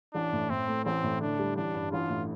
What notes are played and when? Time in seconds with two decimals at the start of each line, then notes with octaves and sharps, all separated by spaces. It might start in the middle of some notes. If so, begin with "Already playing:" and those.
0.14 A1 D4
0.33 A2
0.50 A2 C4
0.67 A3
0.85 A1 C4
1.03 A2
1.20 D3 D4
1.39 G3
1.57 A1 D4
1.74 G2
1.92 A1 F4
2.10 A2